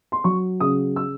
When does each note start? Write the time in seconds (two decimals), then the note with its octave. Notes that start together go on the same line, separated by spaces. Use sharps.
0.12 C6
0.24 F#3 C#6
0.60 C#3 D#6
0.96 E6